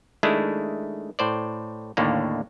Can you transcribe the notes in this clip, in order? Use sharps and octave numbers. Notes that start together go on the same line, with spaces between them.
D#3 G#3 A3 D4 E4
A2 C5 D5
D#2 A2 D3 A#3